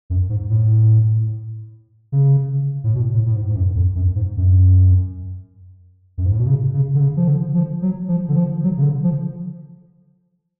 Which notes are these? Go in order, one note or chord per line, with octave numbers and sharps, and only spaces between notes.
F#2
G#2
A2
C#3
A2
B2
A2
A2
G#2
G#2
F#2
F2
F#2
G#2
F#2
F#2
G#2
A2
B2
C#3
C#3
D3
C#3
F3
D3
F3
F#3
F3
D3
F3
F#3
C#3
D3
F3